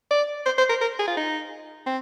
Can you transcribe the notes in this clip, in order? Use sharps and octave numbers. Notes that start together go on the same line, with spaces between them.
D5
C5
C5
A#4
A#4
G#4
F4
D#4
C4